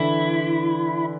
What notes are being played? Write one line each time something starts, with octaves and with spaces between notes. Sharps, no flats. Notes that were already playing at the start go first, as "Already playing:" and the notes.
Already playing: D3 E3 E4